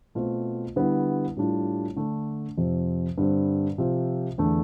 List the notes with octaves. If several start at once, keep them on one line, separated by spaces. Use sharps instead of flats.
B2 A3 C4 F4
D3 G3 B3 E4
A2 G3 D4 F4
D3 A3 D4
F2 C3 F3 C4
G2 D3 G3 C4
C3 F3 C4 F4
E2 D3 A3 D4